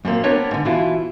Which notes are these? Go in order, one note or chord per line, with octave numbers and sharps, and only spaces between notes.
F#2 A#2 A#3 C4
B3 C4 D4 A#4 B4 C#5
G#2 D3
B2 E3 E4 F4